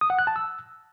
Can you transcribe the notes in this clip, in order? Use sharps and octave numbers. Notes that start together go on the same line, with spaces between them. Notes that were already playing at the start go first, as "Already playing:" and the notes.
D#6
F#5
F#6
A5
E6